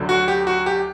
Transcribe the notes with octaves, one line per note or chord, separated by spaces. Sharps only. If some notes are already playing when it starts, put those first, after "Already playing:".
Already playing: D2 D3 F#3
F#4
G4
F#4
G4